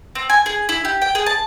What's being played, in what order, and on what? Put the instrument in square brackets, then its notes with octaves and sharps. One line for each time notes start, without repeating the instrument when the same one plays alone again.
[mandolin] C4
G#5
G#4
E4
G4
G5
G#4
A5